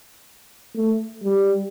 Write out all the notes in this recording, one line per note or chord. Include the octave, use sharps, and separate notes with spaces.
A3
G3